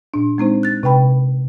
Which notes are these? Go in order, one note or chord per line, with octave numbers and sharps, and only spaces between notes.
A#2 D4
G#3 C4 D#4 C5
F#6 A6
C3 B4 G5 B5